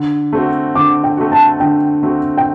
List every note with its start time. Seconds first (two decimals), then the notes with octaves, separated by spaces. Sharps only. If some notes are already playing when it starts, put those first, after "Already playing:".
Already playing: D3
0.33 A3 C4 F#4
0.75 D3 D6
1.04 G5
1.17 A3 C4 F#4
1.32 A5
1.60 D3 G5
2.03 A3 C4 F#4
2.37 G5